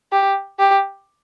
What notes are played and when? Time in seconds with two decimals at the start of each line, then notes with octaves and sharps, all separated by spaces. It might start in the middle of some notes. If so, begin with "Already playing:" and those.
0.12 G4
0.59 G4